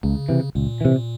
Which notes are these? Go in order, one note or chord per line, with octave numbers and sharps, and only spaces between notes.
C#2 C#3
C3 E3
C#2 A#2
C3 E3